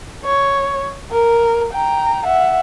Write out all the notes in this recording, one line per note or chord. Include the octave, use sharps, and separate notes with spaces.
C#5
A#4
G5 A#5
E5 F#5